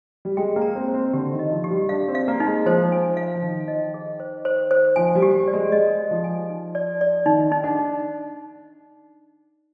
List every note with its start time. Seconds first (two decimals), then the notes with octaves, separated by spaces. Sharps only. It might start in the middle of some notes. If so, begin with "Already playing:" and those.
0.25 G3
0.37 G#3 G5
0.56 A#3
0.62 A#5
0.75 C4
0.88 C5
0.94 C4
1.13 D3 G4
1.32 D#3
1.39 D#5
1.51 F3
1.64 G4
1.71 G3
1.89 D4 F5
2.08 C4
2.15 F5
2.28 A#3
2.40 D#4
2.47 G#3
2.66 F3 C5
2.92 G#5
3.17 F5
3.35 F3
3.42 D#3 D#4
3.68 D#5
3.94 G#4
4.20 C5
4.45 C5
4.71 C5
4.96 F3 G#5
5.15 G3
5.22 G4
5.34 G3
5.48 D5
5.53 G#3
5.72 G#3 D#5
5.98 D#5
6.11 F3
6.24 G#5
6.50 D#4
6.75 D5
7.01 D5
7.26 D#3 D#4
7.52 D#4
7.64 D4